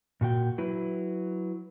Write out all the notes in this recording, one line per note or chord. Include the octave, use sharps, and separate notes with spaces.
A#2 F#4 G5
F#3 E4 B4